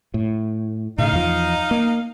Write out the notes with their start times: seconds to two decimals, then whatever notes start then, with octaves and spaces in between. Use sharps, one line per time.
0.14 A2
0.98 A2 C#3 D#4 F5
1.13 E2 F3
1.71 A#3